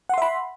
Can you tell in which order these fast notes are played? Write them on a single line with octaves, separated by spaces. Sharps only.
F#5 C6 E5 B5